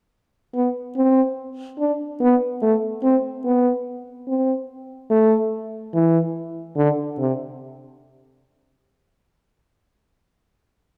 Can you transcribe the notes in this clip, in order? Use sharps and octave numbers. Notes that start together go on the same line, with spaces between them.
B3
C4
D4
B3
A3
C4
B3
C4
A3
E3
D3
C3